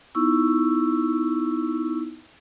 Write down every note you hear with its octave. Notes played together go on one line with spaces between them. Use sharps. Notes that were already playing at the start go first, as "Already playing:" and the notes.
B3 D#4 E4 C#6 E6